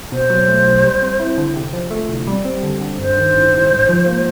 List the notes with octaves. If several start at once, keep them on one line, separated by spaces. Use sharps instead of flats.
B2 C5
F#3
A3
B1
G3
C4
E4
D3
C3
F3
A3
C2
G3
C4
D3
D3
G2 C5
D#3
A1
A1
G#2
F3
A#3